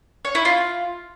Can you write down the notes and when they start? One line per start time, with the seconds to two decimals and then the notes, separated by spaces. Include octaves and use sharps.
0.25 C#5
0.35 E4
0.45 F4